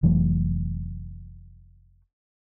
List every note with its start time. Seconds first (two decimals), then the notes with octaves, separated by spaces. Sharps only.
0.03 F1 E3 F#3 A3